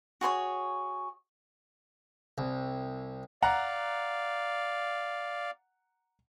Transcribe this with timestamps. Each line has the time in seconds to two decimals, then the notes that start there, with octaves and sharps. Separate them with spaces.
0.21 F#4 G#4 C5 C#5
2.38 C2
3.43 D5 F5 F#5 A#5